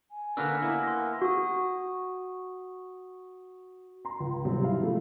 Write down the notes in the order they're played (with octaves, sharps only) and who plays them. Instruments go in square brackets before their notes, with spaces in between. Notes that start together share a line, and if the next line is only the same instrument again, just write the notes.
[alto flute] G#5
[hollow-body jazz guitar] D3 D4 [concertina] A#3 F#4 B4 [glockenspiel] E6 F6
[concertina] A#3 B3 [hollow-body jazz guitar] E4
[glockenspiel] C6 A#6
[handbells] F#4 D#6
[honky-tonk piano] A#5 C6
C#2
G#2 C3 F#3 G3
E4 F5
F3 F#3 G#3 A3